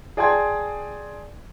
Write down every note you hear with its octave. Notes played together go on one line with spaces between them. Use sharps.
G#4 D5 G5 A5 C6 G#6